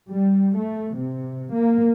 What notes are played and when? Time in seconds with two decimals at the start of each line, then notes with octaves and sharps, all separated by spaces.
0.11 G3
0.57 A3
0.96 C3
1.53 A#3